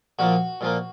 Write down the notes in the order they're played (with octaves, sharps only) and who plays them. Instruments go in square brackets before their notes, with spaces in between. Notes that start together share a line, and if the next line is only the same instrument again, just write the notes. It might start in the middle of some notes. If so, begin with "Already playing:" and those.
[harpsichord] A#2 F3 A#3 F#4
A#2 F3 A#3